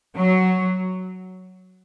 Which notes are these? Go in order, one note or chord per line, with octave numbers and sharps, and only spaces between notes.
F#3